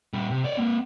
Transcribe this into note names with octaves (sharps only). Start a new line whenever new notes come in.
G3 C#4
C3
C#5 D5
A#3 C4